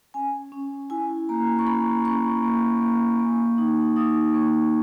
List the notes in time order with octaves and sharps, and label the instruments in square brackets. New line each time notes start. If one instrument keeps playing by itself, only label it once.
[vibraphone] C#4 G#5
C#4
E4 G#5
A#3 A#5
C#6
C#4 B5
C#4 C#6
A#3
A#3
A#3
D#4
D#4 D#6
A#3 C#6